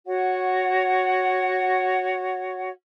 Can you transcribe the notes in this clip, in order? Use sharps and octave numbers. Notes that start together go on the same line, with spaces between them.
F#4 C#5 F#5